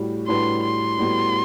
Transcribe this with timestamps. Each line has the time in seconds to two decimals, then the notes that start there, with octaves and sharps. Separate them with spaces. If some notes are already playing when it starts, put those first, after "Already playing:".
Already playing: A2 G3 F#4
0.27 A2 G3 D4 F#4 B4 C6
0.64 C6
0.99 A2 G3 B3 F#4